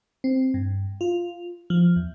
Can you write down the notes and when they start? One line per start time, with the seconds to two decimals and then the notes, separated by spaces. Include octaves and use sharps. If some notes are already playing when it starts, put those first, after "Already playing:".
0.24 C4
0.54 G2
1.01 F4
1.70 F3
1.96 E2